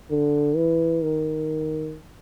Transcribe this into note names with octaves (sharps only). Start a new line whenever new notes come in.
D3
E3
D#3